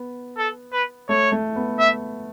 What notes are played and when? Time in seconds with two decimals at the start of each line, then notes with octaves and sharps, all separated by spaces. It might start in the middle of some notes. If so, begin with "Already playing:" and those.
Already playing: B3
0.38 A4
0.73 B4
1.09 A3 C#5
1.32 A3
1.56 B3
1.79 E5